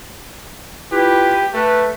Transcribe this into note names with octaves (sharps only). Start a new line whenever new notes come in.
E4 F4 G4 B4
A3 B4